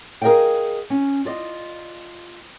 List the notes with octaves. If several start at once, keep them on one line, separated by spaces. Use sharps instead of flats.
G#4 A#4 D5 D#5 F5 G5
C#4
F4 D5 D#5